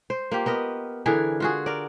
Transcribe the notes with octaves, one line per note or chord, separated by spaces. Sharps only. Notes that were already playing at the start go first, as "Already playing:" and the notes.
C5
A#3 F4 G4
B3 A#4 D#5
D3 E3 G#4 A#4
F4 F#4 G#4
A#4 D5